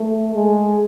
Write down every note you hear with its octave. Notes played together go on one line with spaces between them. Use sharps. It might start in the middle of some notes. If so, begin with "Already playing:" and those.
Already playing: A3
G#3